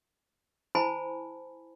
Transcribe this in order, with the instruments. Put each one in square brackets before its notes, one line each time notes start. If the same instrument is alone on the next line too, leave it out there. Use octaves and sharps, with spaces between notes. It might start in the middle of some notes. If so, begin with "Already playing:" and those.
[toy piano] E4 C5 G#5 A5 B5